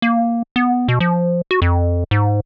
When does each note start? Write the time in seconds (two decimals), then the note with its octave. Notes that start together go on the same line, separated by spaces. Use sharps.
0.02 A#3
0.56 B3
0.88 B2
1.00 F3
1.51 F#4
1.62 F2
2.11 G#2